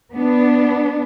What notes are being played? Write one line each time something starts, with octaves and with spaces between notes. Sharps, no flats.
B3 D4